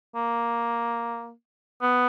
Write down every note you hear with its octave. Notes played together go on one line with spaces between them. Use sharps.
A#3
B3